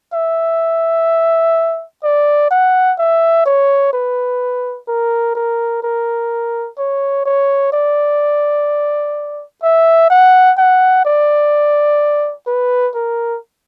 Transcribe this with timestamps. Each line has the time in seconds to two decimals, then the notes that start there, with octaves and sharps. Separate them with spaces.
0.13 E5
2.03 D5
2.51 F#5
2.98 E5
3.46 C#5
3.93 B4
4.88 A#4
5.35 A#4
5.83 A#4
6.78 C#5
7.25 C#5
7.73 D5
9.63 E5
10.10 F#5
10.58 F#5
11.05 D5
12.47 B4
12.95 A#4